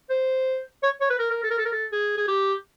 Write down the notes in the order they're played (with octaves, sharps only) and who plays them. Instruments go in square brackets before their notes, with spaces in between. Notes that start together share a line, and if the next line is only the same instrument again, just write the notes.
[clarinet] C5
C#5
C#5
B4
A#4
A#4
A4
A#4
A4
A#4
A4
G#4
G#4
G4